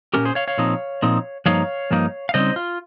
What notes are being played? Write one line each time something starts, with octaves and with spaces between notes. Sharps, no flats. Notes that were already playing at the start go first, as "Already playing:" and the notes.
A#2 G3 C#4 G4 A#4
G#4 C5
C#5 F5
C#5 F5
A#2 F3 C4 D#4
A#2 F3 C4 D#4
G2 F3 A#3 D#4 C#5 F5
G2 F3 A#3 D#4
F5
C#3 G3 C4 D#4 C5 D#5
F4